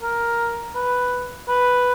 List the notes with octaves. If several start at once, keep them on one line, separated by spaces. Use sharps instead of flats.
A#4
B4
B4